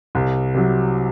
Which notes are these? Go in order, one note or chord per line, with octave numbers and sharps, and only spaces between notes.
C2
C3 F#3